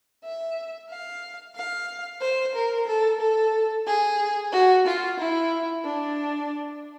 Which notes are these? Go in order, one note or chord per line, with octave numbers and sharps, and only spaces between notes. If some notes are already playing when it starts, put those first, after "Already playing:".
E5
F5
F5
C5
A#4
A4
A4
G#4
F#4
F4
E4
D4